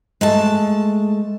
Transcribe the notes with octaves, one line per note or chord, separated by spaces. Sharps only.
G#3 A3 A5